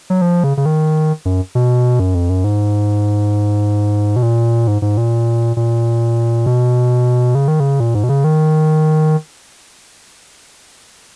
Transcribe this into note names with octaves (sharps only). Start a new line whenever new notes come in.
F#3
F3
C#3
C#3
D#3
F#2
B2
F#2
F2
F#2
G#2
B2
A#2
G#2
G#2
A#2
A#2
B2
C#3
D#3
C#3
A#2
G#2
B2
C#3
D#3